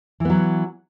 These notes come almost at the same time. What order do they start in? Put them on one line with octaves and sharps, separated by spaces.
E3 B3 F#3